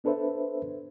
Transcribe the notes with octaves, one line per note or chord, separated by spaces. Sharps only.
B3 D4 A4 B4 C5 E5